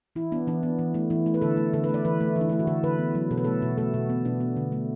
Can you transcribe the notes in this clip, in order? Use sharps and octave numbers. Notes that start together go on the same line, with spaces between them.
E3 E4
B3 D4
E3 D4
B3
E3
A3
E3 E4
A3
B4
D3 A4
A3
D3 A4
B4
A3
D5
E3 B4
A3
E3
D4
A3 E4
F#4
D3 A4
D3 B4
B3
F#3
B2 A4
B4
A3 A4
B2 F#4
A3 A4
B2 F#4
B3
B2 D4
B3
D3
A3